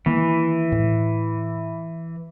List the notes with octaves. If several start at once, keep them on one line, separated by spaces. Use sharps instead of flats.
D#3 E3 A#3
A2